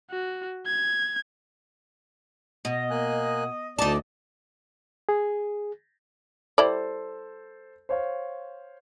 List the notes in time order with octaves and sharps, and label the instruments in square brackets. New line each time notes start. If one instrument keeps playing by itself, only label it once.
[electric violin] F#4
G#6
[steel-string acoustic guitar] B2 [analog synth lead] D#5
[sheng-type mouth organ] A#3 G#5 F#6
[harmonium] D2 D5 [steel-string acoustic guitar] D#4 A5 [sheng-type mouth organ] D#5
[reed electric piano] G#4
[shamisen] G3 E4 D5 [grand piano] A4 C5
[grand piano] C5 C#5 F5